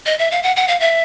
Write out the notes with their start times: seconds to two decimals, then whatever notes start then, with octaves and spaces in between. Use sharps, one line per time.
0.06 D#5
0.19 E5
0.32 F5
0.43 F#5
0.56 F#5
0.68 F5
0.80 E5